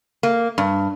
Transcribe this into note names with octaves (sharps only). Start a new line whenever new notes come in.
A#3
G2